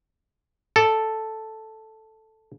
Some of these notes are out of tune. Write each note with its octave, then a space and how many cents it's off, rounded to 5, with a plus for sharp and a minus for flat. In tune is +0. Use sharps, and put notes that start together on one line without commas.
A4 +0 D5 +0